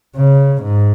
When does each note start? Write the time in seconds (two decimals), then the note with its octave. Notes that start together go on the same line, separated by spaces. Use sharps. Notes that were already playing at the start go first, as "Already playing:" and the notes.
0.16 C#3
0.63 G#2